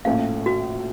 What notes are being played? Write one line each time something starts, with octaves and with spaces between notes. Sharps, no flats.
A#1 A2 A3 C#4 F5
F#4